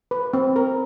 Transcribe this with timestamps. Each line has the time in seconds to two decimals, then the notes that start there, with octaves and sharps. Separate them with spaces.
0.11 B4
0.33 C4
0.56 A#4